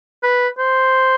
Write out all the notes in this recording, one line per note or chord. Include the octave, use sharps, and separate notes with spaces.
B4
C5